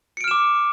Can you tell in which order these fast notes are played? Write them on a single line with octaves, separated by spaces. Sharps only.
C#7 D7 F6 E7 D6